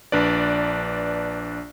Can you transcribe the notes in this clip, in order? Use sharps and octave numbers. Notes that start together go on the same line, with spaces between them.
A#1 D4 B4 D5